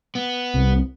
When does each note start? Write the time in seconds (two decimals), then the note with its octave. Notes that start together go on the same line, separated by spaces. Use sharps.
0.15 B3
0.54 C2